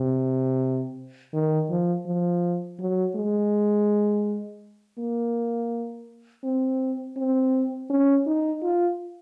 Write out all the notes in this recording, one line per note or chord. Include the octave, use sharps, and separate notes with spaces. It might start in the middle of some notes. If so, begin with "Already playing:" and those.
Already playing: C3
D#3
F3
F3
F#3
G#3
A#3
C4
C4
C#4
D#4
F4